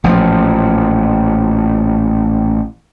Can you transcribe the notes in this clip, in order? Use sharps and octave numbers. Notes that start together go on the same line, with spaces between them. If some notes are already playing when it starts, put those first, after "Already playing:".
A1 A#2 F3